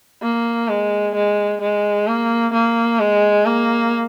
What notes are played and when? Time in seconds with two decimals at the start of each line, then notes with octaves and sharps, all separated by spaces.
0.23 A#3
0.69 G#3
1.15 G#3
1.61 G#3
2.07 A#3
2.53 A#3
3.00 G#3
3.46 A#3